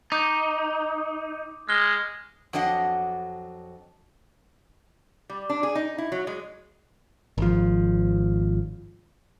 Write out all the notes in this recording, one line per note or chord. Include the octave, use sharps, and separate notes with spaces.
D#4 D6 D#6 G6
G#3 F6 G7
F2 F#3 D4 D#5 F#5
G3
D4
G#4
D#4
E4
F#3
G#3
G#1 F3